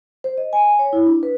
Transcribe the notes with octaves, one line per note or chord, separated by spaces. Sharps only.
C5
D#5
G#5
G#5
C#5
E4
D4
B4